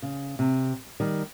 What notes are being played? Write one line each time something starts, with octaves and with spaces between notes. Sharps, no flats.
C#3
C3
D#3 G3